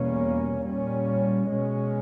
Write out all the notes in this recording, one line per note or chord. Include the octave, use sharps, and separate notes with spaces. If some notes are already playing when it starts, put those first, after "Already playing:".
Already playing: E2 B2 G3 A#3 C#4
A#2 G3 C#4
B2 G#3 C#4